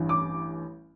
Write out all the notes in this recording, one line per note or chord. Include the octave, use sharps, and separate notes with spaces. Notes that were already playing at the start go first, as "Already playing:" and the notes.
Already playing: A1 G2 E3
D6